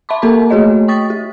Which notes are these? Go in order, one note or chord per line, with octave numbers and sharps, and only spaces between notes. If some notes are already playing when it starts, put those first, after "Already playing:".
E5 A5 B5 C6 D6
A#3 A4 A#4 A#5 D6
A3 F#4 G#4 C#5 D#5
G5 C#6 D#6 A6 B6
G4